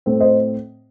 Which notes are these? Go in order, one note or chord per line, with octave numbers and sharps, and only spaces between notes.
A2 A3 C4
C5 D#5